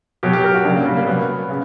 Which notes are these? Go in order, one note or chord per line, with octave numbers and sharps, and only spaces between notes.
B2 F#3 G4
G4
A#4
F#4
C#3 F#3 D4
A#3
G3
A#3
B2 F#3 B3
C#3